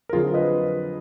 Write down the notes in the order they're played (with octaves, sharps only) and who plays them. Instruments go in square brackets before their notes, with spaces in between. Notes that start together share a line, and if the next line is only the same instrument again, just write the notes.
[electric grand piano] A#4
F2 D3 F#3 F4 G#4
B4 D#5